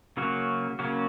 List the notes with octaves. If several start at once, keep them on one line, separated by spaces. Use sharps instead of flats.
C#3 F#3 A#3 C#4 F#4
C#3 F#3 A#3 C#4 F#4